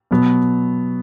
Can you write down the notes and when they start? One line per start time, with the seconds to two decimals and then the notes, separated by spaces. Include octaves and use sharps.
0.11 B2 F#3 B3